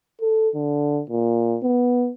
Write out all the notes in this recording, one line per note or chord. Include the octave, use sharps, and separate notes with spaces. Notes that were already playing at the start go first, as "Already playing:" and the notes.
A4
D3
A#2
B3